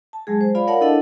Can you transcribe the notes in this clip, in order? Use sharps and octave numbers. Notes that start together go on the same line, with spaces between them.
A5
F#3 G#3 G#4
C5
F4 D5 F5 B5
A#4 C#5 D5 F5 F#5 A5
D4 E4 A4 D#5 F#5